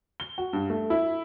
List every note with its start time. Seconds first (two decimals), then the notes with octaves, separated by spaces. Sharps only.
0.20 G7
0.38 F#4
0.53 G2
0.70 A3
0.90 E4